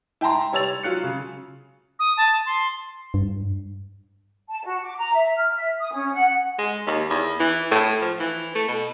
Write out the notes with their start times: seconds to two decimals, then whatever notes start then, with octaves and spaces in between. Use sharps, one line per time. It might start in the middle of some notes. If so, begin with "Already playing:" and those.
0.21 E4 G5 A5 A#5 C6
0.52 G3 C#5 E6 A6 F7
0.83 F#3 F4 F#6 C#7
1.04 C#3
1.99 D#6
2.17 A5
2.46 C6
3.14 G2
4.49 A5
4.65 F#4
4.82 D6
4.97 A#5
5.14 E5
5.36 F6
5.54 E5
5.80 D#6
5.92 C#4
6.13 F#5
6.58 G#3
6.87 D#2
7.10 E2
7.40 E3
7.71 A2
8.02 F3
8.20 E3
8.55 A3
8.68 B2